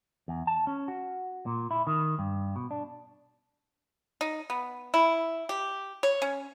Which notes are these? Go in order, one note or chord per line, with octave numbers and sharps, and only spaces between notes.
E2
A5
C#4
F#4
A#2
E4
D#3
G2
B2
D4
D#4
B3
E4
G4
C#5
C#4